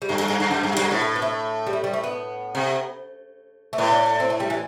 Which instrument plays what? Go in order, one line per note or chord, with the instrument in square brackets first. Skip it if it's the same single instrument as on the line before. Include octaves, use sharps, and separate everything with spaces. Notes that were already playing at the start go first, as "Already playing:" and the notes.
[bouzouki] G3
[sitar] G2 [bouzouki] A3
[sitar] G2
G2
G2
F#2
G2
[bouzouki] G3
[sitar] G2 [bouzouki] A3
[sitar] A2 [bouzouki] B3
[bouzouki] A3
B3
A3
G3
A3
G3
A3
B3
[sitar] C3
[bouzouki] A3
[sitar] A2 [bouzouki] B3
[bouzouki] D4
D4
C4
A3
G3
E3